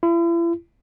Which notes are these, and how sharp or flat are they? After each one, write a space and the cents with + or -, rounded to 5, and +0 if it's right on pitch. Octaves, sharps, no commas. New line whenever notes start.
E4 +40